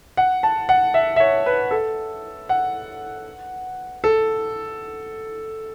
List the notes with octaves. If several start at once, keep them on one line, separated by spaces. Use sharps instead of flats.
F#5
A5
F#5
E5
E5
C#5
B4
A4
F#5
A4